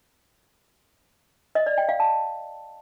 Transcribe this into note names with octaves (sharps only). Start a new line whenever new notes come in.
D#5
D5
G5
F5
A5